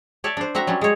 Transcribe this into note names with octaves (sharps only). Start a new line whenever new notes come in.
C#5 D5 E5 A5
D4 C5
C4 F#4 E5 A#5
F#3 G3 C#4
G#3 C#5